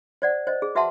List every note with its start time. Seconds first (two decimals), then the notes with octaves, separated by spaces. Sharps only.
0.22 C5 D5 F#5
0.47 C5 D#5
0.62 G#4
0.75 F#4 B4 E5 F#5 A5 C6